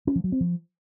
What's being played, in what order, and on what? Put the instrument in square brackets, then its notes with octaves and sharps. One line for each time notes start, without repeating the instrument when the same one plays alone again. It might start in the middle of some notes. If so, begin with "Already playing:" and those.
[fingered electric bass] C#4
F3
F#3
C4
F3